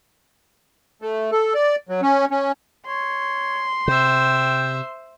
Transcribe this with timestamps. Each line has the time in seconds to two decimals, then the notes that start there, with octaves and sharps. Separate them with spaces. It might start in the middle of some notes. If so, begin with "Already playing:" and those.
1.02 A3
1.32 A4
1.54 D5
1.89 F#3
2.02 C#4
2.31 C#4
2.87 C#5 C6
3.88 C3 C5 E5 G5